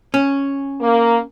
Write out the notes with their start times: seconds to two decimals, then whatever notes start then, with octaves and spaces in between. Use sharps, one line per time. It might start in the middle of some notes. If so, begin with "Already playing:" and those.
0.14 C#4
0.81 A#3